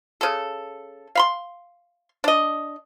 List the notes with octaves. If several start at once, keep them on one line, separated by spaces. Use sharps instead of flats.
C#3 A4
F5 B5 C6
D4 D#5